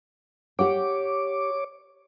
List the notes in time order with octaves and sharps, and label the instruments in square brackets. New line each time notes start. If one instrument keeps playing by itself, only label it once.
[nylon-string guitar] G4 F#5 G5 [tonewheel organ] C#5 D6